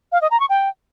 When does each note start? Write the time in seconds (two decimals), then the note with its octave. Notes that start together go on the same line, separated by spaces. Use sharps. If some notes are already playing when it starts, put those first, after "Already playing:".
0.12 F5
0.21 D#5
0.31 A#5
0.40 C#6
0.49 G5